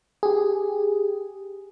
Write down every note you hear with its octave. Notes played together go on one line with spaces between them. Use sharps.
G4 G#4